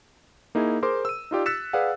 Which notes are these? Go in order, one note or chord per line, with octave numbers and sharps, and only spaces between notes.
A#3 D#4 E4 G#4
G#4 A#4 C5 C6 D6
E6 D#7
D#4 F4 G4 D5
E6 F#6 A6 B6 C#7 E7
G#4 B4 D5 F5 F#5